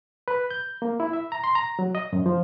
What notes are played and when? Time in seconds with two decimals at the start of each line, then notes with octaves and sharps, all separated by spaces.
0.28 B4
0.51 G6
0.82 A#3
1.00 E4
1.13 E5
1.32 A#5
1.44 C6
1.55 A#5
1.79 F#3
1.95 D#5
2.13 F#2
2.26 F3